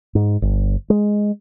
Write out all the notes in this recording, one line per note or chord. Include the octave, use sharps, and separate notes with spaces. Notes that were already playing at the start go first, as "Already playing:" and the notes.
G#2
G1
G#3